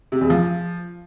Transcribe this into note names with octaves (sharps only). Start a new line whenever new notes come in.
C3
E2
F3